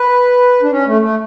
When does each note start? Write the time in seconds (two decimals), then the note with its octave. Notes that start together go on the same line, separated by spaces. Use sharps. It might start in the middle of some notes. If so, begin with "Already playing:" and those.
Already playing: B4
0.62 D4
0.71 C#4
0.87 A3
1.02 A3